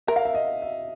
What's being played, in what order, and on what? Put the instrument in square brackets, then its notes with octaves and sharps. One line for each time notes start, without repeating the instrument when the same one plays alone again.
[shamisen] A#4 [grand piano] E5
[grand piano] F5
E5
D#5
E5